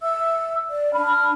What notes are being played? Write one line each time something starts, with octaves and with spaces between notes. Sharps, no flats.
E5 E6
D5
D4 B5 F6